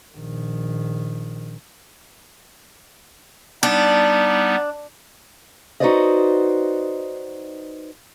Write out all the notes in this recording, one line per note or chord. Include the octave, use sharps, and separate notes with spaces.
A#1 D#3
G3 B3 D4 D#4
D#4 F#4 B4 C5 D5 D#5